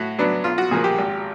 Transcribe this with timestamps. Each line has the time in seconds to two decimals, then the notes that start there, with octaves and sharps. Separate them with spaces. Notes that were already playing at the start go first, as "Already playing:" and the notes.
Already playing: A2 F#4
0.19 F#3 B3 D4
0.44 B1 F4
0.58 F#4
0.71 A#2 F3 A#3 G#4
0.84 G4
0.98 G#1